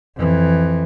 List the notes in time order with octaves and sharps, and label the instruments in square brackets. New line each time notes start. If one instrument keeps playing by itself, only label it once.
[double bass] F2 E3